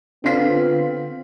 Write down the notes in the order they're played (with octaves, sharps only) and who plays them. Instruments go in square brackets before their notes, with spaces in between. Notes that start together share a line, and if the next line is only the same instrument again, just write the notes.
[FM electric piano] D3 F4 [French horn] B3 [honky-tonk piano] C4 F5 B6